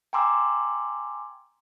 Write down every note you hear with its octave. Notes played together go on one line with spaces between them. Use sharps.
G5 G#5 A#5 C6 D6 E6